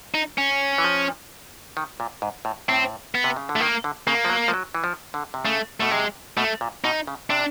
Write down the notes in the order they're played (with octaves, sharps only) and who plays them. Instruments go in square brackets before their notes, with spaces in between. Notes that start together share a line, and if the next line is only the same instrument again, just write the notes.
[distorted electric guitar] D#4
C#4
[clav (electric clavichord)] E3
F3
D#3
A#2
G#2
A2
[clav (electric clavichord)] A2 [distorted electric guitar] C4
[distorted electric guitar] B3
[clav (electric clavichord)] C3
C#3
D3
[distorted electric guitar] A3
[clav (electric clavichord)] D#3 [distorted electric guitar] A#3
[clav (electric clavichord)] D3
[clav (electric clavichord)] C#3 [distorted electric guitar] A#3
[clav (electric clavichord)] F3
F#3
F3
F#3
E3
F3
D3
C3
[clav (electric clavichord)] C#3 [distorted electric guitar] A3
[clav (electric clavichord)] B2 [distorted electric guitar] A3
[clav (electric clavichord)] C3 [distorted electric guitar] G#3
[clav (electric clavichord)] B2 [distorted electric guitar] A3
[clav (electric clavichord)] A#2
[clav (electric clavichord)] B2 [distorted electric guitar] D#4
[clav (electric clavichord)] C#3
[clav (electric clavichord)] C3 [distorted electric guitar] D4